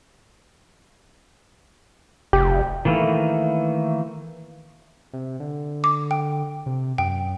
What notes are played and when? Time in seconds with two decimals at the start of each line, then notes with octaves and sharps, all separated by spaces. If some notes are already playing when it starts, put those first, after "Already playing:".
2.33 F1 G4
2.85 D#3 E3 A3 A#3
5.13 C3
5.40 D3
5.84 D6
6.11 G5
6.66 C3
6.98 F#2 G5